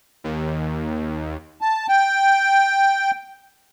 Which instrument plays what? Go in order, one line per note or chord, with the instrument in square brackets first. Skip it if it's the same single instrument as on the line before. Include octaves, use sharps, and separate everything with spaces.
[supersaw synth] D#2
[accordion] A5
G5